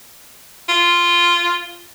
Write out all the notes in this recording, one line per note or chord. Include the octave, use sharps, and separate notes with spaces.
F4